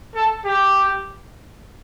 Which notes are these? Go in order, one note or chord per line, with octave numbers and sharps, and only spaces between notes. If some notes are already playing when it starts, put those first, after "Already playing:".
A4
G4